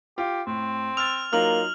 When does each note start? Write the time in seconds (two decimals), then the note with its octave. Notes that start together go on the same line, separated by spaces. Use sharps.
0.18 F4 G4
0.47 A2 C4
0.97 E6 F6 A6 F7
1.33 F#3 A#3 D#4 F4 F6 F#7